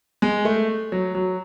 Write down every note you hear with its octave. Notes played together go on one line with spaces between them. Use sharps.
G#3
A3
F#3
F#3